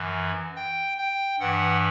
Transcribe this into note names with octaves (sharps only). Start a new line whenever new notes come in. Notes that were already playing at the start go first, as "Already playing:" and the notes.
Already playing: F#2 E3
G5
G5
G2 E3 F#5